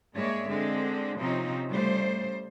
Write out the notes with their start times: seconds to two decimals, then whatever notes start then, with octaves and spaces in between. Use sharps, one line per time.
0.14 G2 G#3 A#3 C#5 D5 E5
0.50 D3 G#3 C4 D4
1.19 C3 F3 C4 C#4 D#4
1.68 C#3 G3 A3 C5